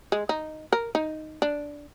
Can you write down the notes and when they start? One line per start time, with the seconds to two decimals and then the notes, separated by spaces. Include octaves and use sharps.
0.12 G#3
0.29 D#4
0.72 A#4
0.95 D#4
1.42 D4